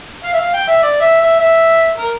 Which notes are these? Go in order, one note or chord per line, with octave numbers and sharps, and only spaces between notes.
F5
E5
F5
G5
E5
D5
E5
E5
E5
A#4